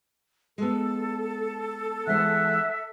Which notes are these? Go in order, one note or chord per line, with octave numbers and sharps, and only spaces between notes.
G#3 B3 A4
E3 G#3 C5 E5 F#5